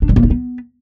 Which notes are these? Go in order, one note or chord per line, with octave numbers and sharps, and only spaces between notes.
D4
G3
A#3
D#4
B3